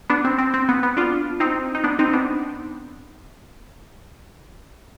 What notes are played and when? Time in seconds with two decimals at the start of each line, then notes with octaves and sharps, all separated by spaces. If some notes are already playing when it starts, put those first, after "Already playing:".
0.10 B3 D4
0.25 C4
0.38 C4
0.54 C4
0.69 B3
0.83 B3
0.97 D4 F4
1.40 C4 D#4
1.75 D#4
1.84 B3 D4
1.99 C4 D#4
2.13 B3 D4